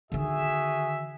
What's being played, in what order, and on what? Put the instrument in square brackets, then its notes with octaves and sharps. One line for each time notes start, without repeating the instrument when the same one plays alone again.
[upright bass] D3 D#3 [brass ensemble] F#4 G#4 E5